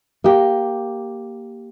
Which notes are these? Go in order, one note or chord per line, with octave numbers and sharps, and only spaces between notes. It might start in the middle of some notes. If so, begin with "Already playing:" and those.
A#3 G4